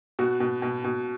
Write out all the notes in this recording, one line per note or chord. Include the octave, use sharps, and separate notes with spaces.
B2 F#4
B2
B2
B2